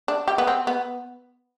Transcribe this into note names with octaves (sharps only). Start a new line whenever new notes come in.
D4
G4
B3
C4
B3